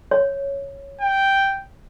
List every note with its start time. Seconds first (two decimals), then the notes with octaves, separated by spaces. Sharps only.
0.11 C#5
1.01 G5